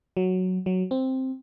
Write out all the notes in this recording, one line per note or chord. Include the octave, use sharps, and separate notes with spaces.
F#3
F#3
C4